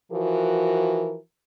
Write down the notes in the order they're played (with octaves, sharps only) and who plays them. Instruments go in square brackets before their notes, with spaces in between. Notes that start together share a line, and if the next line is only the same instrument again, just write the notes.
[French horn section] E3 F3 F#4 A#4